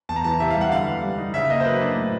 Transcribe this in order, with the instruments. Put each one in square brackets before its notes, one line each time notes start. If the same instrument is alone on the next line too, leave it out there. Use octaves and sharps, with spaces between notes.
[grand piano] E2 A5
A#5
E3 A5
C3 E5
F5
G3 F#5
D3 F5
B3
G3
D#4
C#3 E5
A#3 D#5
C5
F#3 B4
D4
A2